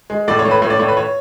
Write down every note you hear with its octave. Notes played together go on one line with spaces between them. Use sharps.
G#3
A2 D5
C#5
A2
B4
A2 C#5
D5
A2 C#5
B4
C#5